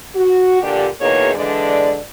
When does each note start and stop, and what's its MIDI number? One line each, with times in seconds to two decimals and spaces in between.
0.15 0.59 66
0.62 0.87 46
0.62 0.87 50
0.62 0.87 62
0.62 0.87 67
1.01 1.34 40
1.01 1.34 47
1.01 1.34 58
1.01 1.34 63
1.01 1.34 68
1.01 1.34 73
1.35 1.98 50
1.35 1.98 52
1.35 1.98 56
1.35 1.98 62
1.35 1.98 74